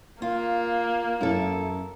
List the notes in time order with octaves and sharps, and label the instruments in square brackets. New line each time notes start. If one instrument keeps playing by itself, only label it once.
[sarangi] A#3 [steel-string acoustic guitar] F4
[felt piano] F#2 [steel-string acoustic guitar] E4 A4